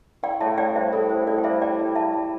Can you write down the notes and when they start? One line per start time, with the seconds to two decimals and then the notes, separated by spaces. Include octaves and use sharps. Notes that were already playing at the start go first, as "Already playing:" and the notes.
0.23 E4 D5 G5
0.40 A2 E5 A5
0.57 A2 D5 G5
0.76 G3 C5 E5
0.92 E4 A4 D5
1.09 A2 C5
1.22 E5
1.27 A2 A4 D5
1.38 G5
1.44 G3 C5 E5
1.62 E4 D5 G5
1.79 A2
1.96 A2 E5 A5
2.13 G3